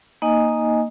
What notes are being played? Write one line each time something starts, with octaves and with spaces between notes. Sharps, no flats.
A#3 D#4 D#5 G#5